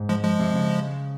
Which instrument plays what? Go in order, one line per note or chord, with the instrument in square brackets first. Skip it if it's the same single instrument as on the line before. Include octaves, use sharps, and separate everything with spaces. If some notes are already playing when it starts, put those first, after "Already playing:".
Already playing: [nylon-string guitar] G#2
[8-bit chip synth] F3 G#3
F3 G#3
[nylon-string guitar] C3
C#3